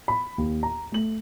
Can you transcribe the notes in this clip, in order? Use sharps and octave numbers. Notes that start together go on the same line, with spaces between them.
B5
D#2
A#5
A3 F#7